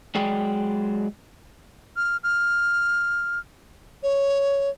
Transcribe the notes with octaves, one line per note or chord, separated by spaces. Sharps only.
F#3 G#3 G#4 D5 G5
F6
F6
C#5